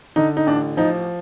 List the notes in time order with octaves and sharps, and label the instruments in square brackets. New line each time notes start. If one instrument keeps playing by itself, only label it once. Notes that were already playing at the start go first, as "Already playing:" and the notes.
[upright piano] D3 D#4
D#4
A1 D4
F3 D#4